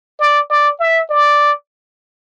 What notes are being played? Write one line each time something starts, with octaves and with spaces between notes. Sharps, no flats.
D5
D5
E5
D5